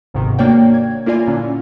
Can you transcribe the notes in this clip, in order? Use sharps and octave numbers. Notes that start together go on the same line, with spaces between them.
G1 G#2 C3 D#3
A#3 D4 F#4 C#5 D5 G5
G#6
A#3 E4 F4 D5 G#5
A#2 D3 C#4